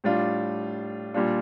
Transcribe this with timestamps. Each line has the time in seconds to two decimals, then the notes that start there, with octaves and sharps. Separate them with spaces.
0.04 A2 G3 D4 F4
1.14 A#2 G3 D4 F4